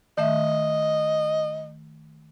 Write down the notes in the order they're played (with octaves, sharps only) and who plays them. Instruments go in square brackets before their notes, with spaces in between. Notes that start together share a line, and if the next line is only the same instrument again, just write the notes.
[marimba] D#3 A3 E5 [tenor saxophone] D#5